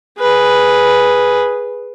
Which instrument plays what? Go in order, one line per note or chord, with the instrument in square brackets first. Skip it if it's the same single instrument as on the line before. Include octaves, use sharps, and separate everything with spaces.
[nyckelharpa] G#4 B4